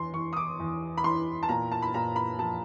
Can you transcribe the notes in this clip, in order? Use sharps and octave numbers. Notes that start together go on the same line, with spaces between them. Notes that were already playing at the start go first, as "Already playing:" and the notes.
Already playing: E2 C6
E2 C#6
D#6
D6
E2
B5
E3 C6
A5
A#2 A#5
A5
B5
A#2 A#5
B5
F3 A5